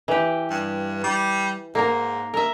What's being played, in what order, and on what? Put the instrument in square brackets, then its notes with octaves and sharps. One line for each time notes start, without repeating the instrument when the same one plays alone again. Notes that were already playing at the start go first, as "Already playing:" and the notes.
[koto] E3 G4
[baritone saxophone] G2
G3
[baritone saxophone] G#2 [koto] A#3 A#4
[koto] A#4 E5